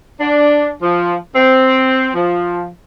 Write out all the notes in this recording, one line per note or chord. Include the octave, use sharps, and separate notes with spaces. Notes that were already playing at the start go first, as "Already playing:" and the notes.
D4
F3
C4
F3